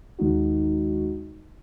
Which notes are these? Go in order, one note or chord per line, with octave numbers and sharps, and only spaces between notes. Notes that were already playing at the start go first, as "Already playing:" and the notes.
D#2 D#3 G#3 D#4 F#4